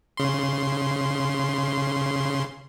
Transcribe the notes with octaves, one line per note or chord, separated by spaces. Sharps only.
C#3 C6